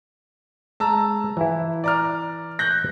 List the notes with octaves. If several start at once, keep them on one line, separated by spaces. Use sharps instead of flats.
G#3 A5 A#5 E6
E3 E4
D5 A#5 F6
F#6 G6 A#6